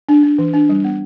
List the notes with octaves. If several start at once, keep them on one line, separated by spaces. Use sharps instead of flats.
D4
D4
E3
D4
G3
B3